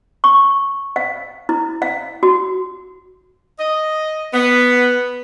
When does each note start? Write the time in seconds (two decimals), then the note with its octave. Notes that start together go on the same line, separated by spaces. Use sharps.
0.24 C#6
0.96 F5
1.49 E4
1.82 F5
2.23 F#4
3.59 D#5
4.34 B3